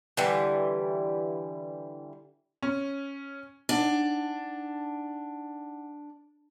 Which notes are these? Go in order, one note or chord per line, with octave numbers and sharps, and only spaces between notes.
D3 E3 G3
C#4
D4 D#4 F#5 G#5